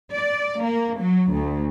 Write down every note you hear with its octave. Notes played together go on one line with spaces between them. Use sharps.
D5
A#3
F#3
D2